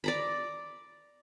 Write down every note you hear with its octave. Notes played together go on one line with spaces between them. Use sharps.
D5 A#5 B5